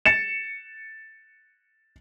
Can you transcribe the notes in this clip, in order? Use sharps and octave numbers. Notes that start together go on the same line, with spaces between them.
A6 C#7 E7